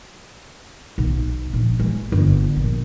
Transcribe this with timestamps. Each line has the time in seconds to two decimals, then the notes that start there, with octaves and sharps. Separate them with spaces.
0.98 B1
1.53 A#1
1.80 G#3
2.12 G1
2.56 A#1